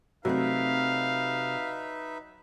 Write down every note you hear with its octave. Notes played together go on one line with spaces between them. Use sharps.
C3 F#3 A3 C4 D#4 B4 E5 F5